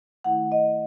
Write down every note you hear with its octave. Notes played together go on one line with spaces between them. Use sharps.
D#3 A3 E4 F#5
D#5